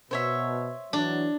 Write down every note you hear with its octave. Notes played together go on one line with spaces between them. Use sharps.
B2 C5 C#5 E5
E3 F#3 D4